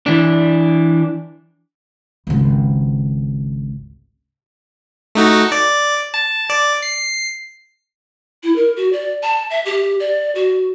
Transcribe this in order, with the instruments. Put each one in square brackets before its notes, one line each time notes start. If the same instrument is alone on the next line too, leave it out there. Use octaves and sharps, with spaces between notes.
[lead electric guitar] E3 D4
[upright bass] G#1 C#2
[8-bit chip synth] A3 D#4 F#4
D5
A5
D5
C7
[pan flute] E4
A#4
F#4
D5
A5
E5
G4
D5
F#4